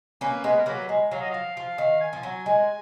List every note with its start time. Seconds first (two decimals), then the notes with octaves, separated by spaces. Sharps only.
0.21 A#3 C#4 B4
0.44 G#3 B3
0.51 B4
0.59 A#4
0.66 F#3 A#3 B4
0.89 G#3
1.11 F#3 F5
1.21 D#5
1.31 F3 F5
1.56 F3 F5
1.78 D#3
2.01 G#5
2.13 F3
2.23 F#3
2.46 G#3